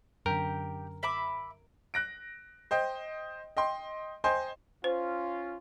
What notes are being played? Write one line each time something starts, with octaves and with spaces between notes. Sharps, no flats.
F#2 D3 G4 A#4
E5 B5 D6
F#6 A#6 D7
C5 D#5 G5
D#5 G5 C6
C5 D#5 G5 G#5 C6
C#4 F4 C5